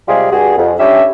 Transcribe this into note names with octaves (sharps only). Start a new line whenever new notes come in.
C3 G3 G#3 F4 G4 G#4
G2 G3 F#4 G#4
F2
G3 C#4 D4 G4 E5